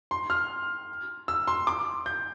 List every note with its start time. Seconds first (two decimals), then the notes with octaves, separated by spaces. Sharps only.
0.11 C6
0.30 F6
1.28 E6
1.47 C6
1.67 D6
2.06 G6